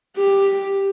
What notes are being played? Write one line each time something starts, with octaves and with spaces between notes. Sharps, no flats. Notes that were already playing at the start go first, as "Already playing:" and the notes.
G4